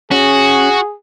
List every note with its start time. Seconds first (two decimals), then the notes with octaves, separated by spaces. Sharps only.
0.11 C#4 F#4 G#4